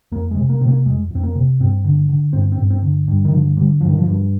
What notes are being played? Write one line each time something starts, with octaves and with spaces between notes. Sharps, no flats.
F2 A#3
G#3
C3
A#3
C3 C4
A#3
F2 G#3
F2 C4
A#3
C3
G2 C4
D3
D3
G2 C4
C4
G2
C4
D3
G2
D#3
D3 F3
D3 G3
G2 F3
D#3
F3
G2